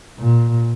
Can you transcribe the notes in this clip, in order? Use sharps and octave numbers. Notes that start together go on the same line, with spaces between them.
A#2